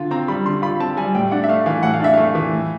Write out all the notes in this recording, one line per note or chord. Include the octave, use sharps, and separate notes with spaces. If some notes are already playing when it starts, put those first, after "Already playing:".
Already playing: D3 F4
C4 A#5
G3 B5
D3 C6
F4 B5
C4 A5
G3 G#5
A2 G5
D4 F#5
E5
A3 F5
E3 F5
A2 F#5
F5
D4 E5
A3 F5
E3
A2